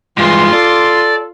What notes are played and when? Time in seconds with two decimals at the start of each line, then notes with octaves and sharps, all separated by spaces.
0.18 G2 E3 G#3 F4 C6
0.53 A4 D5